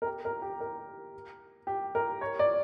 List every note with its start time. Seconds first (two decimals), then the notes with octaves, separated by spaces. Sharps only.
0.02 A#4
0.06 G4
0.25 A#4
0.42 G4
0.61 A#4
1.67 G4
1.95 A#4
2.21 C#5
2.39 D5